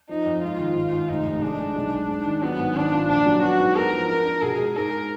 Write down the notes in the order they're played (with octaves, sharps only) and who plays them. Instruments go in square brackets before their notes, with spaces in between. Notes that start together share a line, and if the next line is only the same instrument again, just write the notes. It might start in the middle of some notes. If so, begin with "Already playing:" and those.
[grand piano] F3 [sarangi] D#4
[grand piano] F2
[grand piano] G#2 [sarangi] F4
[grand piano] D#3
G#1
G#1
[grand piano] F1 [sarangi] D#4
[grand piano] F1
[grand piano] G#3 [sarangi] D4
[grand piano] G#3
B1
G#3
G#2
D#3
[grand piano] F#3 [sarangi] B3
[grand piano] G#1
[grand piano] D#3 [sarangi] D4
[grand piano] F4
[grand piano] A#1 [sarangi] D4
[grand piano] F#3
[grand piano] B3 [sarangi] F#4
[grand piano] G#2
[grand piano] B3 [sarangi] A#4
[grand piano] F3
[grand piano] D4 [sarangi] A#4
[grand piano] D4
[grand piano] B2 [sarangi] G#4
[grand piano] G#3
[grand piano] G#2 [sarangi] A#4